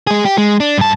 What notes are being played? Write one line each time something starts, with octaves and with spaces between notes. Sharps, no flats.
G#3 G#4
G4
G#3
D4
G2 A5